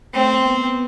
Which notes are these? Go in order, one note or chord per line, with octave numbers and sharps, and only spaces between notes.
A3 C4
B3